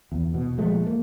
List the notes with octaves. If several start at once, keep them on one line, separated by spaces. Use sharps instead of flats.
E2
B2
A#2 F3 G#3 A3
A#3